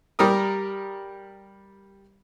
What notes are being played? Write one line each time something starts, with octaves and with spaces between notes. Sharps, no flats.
G3 G4 A#4 D#6